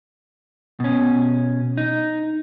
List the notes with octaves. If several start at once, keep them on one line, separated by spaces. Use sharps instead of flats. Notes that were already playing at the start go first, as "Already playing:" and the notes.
B2 C#4
D#4